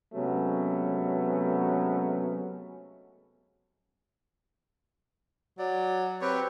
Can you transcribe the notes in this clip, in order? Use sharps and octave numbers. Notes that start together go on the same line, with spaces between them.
C3 F#3 G#3 A3 B3 C#4
F#3 D5
C4 G4 B4 C#5